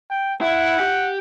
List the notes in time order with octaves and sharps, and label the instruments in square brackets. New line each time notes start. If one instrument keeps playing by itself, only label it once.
[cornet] G5
[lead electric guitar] E4 [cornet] F#5
[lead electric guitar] G4